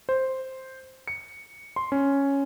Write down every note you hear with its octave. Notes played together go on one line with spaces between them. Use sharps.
C5
C#7
C6
C#4